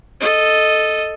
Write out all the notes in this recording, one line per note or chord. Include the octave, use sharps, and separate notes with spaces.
A4 D#5